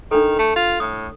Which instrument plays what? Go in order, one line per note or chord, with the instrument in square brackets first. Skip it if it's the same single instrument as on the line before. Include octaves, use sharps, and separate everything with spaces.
[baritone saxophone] D#3 [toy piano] D4 A4
[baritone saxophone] A3
F4
[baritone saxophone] A2 [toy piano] D#6